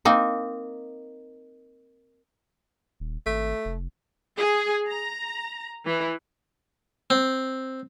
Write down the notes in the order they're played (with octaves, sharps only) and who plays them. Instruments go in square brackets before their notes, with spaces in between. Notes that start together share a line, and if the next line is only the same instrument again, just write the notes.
[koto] A#3 C4 D#4
[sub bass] D#1
[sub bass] G#1 [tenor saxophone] A3
[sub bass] F1
[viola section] G#4
A#5
E3
[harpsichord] C4